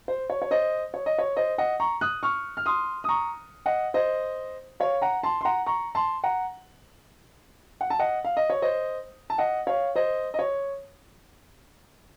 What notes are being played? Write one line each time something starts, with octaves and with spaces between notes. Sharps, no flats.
C5
C#5
C#5
C5 D#5
C#5
D#5
C#5
C5 D#5
D#5 F#5
A#5 C#6
D#6 F#6
C#6 F6
F6
C6 D#6
D#6
A#5 C#6
D#5 F#5
C5 D#5
C#5 F5
F#5 A#5
A5 C6
C6
F#5 A#5
A#5 C#6
A5 C6
F#5 A#5
F#5
A5
D#5 F#5
F5
D#5
C#5
C5 D#5
A5
D#5 F#5
C#5 F5
C5 D#5
D#5
C#5